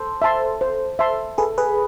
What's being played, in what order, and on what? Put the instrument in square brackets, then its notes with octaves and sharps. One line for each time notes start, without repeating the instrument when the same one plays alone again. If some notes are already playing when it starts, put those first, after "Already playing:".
Already playing: [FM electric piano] A4 C5
[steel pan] E5 A5 C6
C5
E5 A5 C6
[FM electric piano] G#4 B4 [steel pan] A4
[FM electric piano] G#4 B4